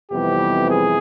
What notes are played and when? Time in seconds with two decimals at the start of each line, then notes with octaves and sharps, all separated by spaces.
0.12 F2 C3 E3 G3 B3 G4
0.70 G#4